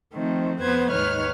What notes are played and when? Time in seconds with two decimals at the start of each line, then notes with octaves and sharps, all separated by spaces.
0.13 D#3 F3 A3 C4
0.61 F2 B3 B4 C5 G#6
0.92 D#2 G#2 D#3 B4 C#5 F6